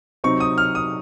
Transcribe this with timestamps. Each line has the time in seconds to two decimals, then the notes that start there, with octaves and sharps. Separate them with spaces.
0.24 C3 F#3 C4 D#4 C#6
0.40 D#6
0.58 F6
0.75 D#6